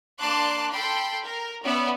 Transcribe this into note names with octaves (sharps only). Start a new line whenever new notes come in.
A#3 D4 A5 C6 D6 F#6
A4 G5 B5 C6
A#4
B3 C#4 D5 E5 B5